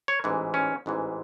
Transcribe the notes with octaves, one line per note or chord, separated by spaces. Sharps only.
C#5
A1 G#2 E3
C#4
A1 G#2 E3